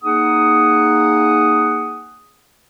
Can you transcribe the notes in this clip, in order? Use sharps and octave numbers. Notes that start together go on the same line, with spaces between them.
A#3 D#4 G#4 F#5 D#6